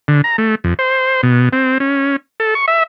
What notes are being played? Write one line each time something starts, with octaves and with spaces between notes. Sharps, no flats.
D3
A#5
A3
F2
C5
B2
C4
C#4
A4
C#6
E5